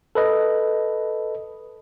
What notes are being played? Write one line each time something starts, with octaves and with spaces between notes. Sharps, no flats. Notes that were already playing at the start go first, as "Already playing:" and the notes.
A4 B4 D#5